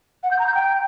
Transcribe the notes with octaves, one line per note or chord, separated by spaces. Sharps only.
F#5
G6
A#5
G6
G5